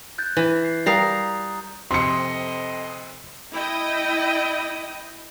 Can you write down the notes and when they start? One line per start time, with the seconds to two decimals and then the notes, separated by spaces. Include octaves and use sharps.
0.18 F#6 G6 A6
0.37 E3
0.64 C7
0.86 G3 A#4 F5 A#5 D#6 A6
1.91 F2 C3 C4 A4 D#5 C6 C#7
3.54 E4 D#5 G5